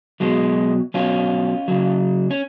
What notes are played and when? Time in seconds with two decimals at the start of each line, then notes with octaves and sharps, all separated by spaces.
0.20 B2 F#3 G#3
0.94 B2 F#3 C#4 F4
1.68 C#3 F#3
2.31 C#4